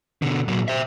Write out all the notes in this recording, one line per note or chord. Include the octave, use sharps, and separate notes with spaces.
B2 D3
A#2 F#3
C5 E5